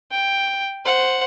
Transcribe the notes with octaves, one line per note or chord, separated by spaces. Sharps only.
G5
C5 F#5